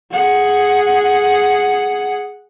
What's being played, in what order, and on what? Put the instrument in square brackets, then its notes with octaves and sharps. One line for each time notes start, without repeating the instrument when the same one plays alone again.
[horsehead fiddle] G#4 F#5